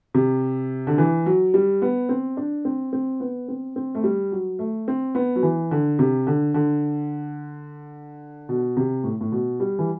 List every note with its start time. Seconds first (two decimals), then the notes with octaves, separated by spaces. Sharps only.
0.14 C3
0.87 D3
0.98 E3
1.26 F#3
1.54 G3
1.82 B3
2.09 C4
2.37 D4
2.65 C4
2.93 C4
3.20 B3
3.48 C4
3.76 C4
3.95 A3
4.04 G3
4.32 F#3
4.59 A3
4.88 C4
5.15 B3
5.36 F#3
5.43 E3
5.71 D3
5.99 C3
6.27 D3
6.54 D3
8.49 B2
8.77 C3
9.04 A2
9.21 A2
9.32 B2
9.60 G3
9.79 E3